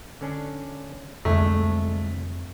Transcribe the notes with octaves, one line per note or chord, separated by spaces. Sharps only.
D3 C#4 D4
C2 F2 D3 G#3 A3